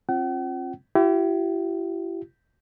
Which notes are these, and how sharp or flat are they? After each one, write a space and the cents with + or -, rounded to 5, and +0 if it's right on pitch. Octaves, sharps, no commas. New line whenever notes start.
C4 +40 F4 +0 F#5 +45
E4 +35 G4 -35